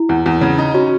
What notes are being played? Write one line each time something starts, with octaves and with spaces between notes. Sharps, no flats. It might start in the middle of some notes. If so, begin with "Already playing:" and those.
Already playing: E4
E2
E2
C#3
D#4
C#4 F#4